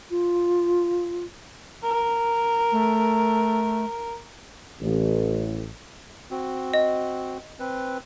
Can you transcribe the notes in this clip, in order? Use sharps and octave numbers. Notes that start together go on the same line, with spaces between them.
F4
A#4
A3
A1
C4 F#4
D#5
C4 B4